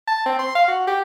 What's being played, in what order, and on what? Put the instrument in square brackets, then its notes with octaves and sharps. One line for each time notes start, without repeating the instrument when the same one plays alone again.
[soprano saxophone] A5
C4
C6
F5
F#4
G4